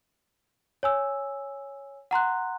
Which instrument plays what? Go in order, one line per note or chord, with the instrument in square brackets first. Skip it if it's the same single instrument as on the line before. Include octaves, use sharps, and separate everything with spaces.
[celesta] C#5 G#5 E6
F#5 A#5 C6 F#6